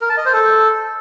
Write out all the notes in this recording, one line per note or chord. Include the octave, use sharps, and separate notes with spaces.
A#4
A5
D#5
C5
A4